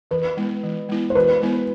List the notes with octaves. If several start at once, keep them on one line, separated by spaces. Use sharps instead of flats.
E3 B4
G#3 B3 E4
E3
G#3 B3 E4
C5
E3 B4
G#3 B3 E4